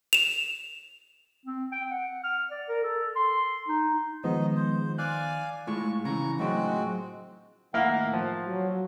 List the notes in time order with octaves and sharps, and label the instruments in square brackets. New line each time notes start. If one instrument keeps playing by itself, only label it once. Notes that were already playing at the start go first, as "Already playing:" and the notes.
[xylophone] E7 F7
[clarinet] C4
G5
F#5
F6
D5
A#4
A4
C6
D#4
[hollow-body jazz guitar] D#3 [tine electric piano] F3 G#3 B3 [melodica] D#4 D#5
[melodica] C5
[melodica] D5 F5 G#5 [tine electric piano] F#6
[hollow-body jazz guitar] A2 G#3 [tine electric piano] F4 [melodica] C#6
[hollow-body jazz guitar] C#3 E3 [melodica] A#5 C#6
[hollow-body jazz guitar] A2 F#3 D4 [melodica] G#3 C4 F#4
[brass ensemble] A2 D#3 F#5 [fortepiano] A#3 E4 F5
[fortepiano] F3
[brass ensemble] F#3